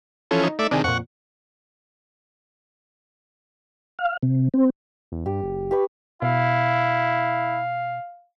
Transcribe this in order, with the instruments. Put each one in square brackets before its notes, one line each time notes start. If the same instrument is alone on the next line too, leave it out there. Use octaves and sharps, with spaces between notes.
[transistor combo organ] E3 F3 C#4 [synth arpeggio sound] A4
[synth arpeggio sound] D#4
[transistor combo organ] A3 D5 E5
[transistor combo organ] C3 D#3 [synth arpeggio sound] D4 G#4
[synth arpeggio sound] F2 A#2 [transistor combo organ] F#5 C#6
[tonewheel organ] F5
C3
C4
[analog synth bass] E2
[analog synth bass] G2 [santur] G4
[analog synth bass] F#1
[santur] G4 B4 C#6
[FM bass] B2 [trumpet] E4 [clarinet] F5